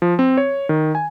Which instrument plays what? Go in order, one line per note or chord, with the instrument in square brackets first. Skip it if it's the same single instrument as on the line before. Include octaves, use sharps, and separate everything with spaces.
[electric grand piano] F3
C4
C#5
D#3
G#5